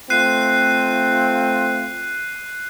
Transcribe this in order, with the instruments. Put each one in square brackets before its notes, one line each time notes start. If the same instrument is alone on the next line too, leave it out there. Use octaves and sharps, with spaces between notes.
[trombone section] A3 C4 F4 [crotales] F#6 C7 D#7